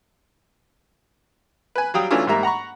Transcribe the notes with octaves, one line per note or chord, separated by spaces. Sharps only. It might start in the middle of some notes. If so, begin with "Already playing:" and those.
B4 G#5
F#3 G3 F5 G5 D#6
E3 F#3 A3 C#4 D4 F4
G#2 G3 A#3 E5 A#5
F#5 A#5 B5 C#6